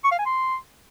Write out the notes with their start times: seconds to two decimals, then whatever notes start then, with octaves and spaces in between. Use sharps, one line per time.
0.04 C#6
0.11 F5
0.19 G#5
0.26 C6